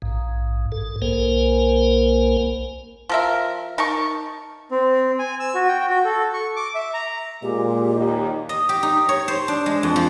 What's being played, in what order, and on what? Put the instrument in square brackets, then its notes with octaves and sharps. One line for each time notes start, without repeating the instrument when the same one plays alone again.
[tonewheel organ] A#1 G#2
G#2 A4
B1 A#3 A#4 C5 G#5
[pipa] F3 A#4 E5
D#4 A#4 A5 C#6
[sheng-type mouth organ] C4
G#5
E6
F#4
G5
F#4
A4
C#6
D6
E5
A#5
[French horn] A#2 [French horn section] G#3 [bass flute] G4
[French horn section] D#2 D#4
[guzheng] D#5
G4
D#4
C#5
C5
D4
G#3
F2
F3